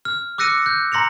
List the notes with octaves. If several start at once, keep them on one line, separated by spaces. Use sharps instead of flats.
F6
D6 E6 F#6 A#6 C#7 D#7
F#6 G6
A#5 C6 A#6 C#7 F7